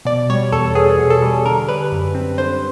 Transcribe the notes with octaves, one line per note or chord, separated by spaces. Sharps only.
B2 D5
G3 C#5
E2 A4
B3 G#4
B2
A4
G3
D3 A#4
G3 B4
F#2
C4
D3 C5